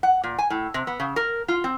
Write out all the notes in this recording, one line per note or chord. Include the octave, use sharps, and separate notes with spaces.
F#5
A#2
G#5
A2
C3
B3
C#3
A#4
F4
C4